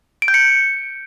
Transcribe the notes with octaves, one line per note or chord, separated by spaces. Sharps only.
D7
G6
C#7